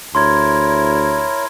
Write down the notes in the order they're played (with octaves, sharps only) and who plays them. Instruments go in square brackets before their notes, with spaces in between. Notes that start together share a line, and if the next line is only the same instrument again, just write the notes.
[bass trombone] D2 [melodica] E4 A#4 [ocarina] C#5 [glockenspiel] C6 G#6